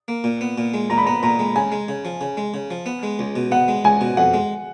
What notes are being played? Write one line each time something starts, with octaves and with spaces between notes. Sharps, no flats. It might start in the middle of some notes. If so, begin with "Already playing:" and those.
A#3
A#2
B3
A#2
G#3
A#2 A#5
B5
B3 A#5
A#2 A#5
G#3
C#3 G#5
G#3
C#3
F3
C#3
G#3
C#3
F3
B3
G#3
C#2
B2
B3 F#5
G#3
C#2 G#5
B2
F2 F#5
G#3